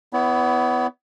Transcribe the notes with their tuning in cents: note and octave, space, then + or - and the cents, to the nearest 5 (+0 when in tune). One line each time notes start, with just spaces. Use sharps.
B3 +20 E4 +0 C#5 +45